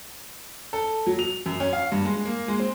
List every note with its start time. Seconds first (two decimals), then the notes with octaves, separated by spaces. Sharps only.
0.73 A4
1.07 F#3
1.19 F7
1.46 F#2
1.60 C#4
1.73 F5
1.92 G2
2.05 G#3
2.25 A#3
2.48 G#3
2.59 C4